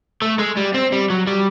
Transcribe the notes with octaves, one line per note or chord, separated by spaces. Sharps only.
A3
G#3
G3
C4
G3
F#3
G3